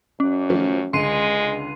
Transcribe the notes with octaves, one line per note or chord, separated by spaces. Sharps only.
F#2 C#4
D#3 F3 A3
C#2 D3 G#3 C6 C7 D#7